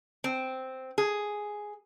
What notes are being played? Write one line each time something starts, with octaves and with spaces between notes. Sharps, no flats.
C4
G#4